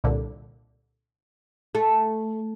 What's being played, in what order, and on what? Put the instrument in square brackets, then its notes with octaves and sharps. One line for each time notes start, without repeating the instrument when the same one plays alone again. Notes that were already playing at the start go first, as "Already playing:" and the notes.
[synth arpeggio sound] C2 A#2 D3
[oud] A3